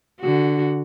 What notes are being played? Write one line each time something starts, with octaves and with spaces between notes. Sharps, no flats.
D3 F#4